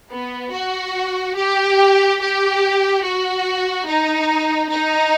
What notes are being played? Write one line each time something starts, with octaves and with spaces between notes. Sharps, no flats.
B3
F#4
G4
G4
F#4
D#4
D#4